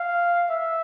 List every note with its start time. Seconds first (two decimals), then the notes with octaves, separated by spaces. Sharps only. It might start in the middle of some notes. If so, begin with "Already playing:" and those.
Already playing: F5
0.49 E5